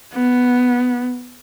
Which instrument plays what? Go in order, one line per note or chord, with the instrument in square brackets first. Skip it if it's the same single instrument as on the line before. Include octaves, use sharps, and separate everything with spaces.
[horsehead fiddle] B3